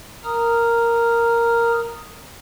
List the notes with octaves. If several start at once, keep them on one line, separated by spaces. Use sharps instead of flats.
A#4 A#5 D#6 F6